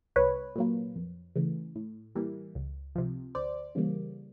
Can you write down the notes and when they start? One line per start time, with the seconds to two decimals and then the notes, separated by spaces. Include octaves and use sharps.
0.16 C2 B4 C#5
0.56 A#2 F#3 A#3
0.96 F2
1.36 C#3 E3 A3
1.75 A2
2.15 E3 G3 A#3
2.55 C#2
2.95 C3 F3
3.35 D2 C5 D5
3.75 C#3 E3 G3 A#3